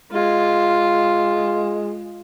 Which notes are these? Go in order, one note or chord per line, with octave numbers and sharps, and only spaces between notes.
G#3 F4